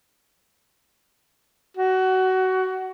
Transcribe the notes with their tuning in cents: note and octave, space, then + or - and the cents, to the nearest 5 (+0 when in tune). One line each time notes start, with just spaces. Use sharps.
F#4 +20